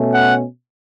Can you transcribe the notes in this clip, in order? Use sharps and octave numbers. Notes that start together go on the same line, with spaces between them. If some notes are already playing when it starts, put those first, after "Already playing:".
Already playing: B2 A3 C#4
F#5